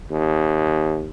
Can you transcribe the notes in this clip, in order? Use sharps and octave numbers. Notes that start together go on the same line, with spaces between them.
D#2